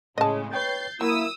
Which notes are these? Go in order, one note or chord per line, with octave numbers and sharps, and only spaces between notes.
A2 C#3 G#3 C#5 D#5 A5 D#6
B4 C#5 G5 G6 A6 C7
F#3 A#3 E4 A#4 D#6 E6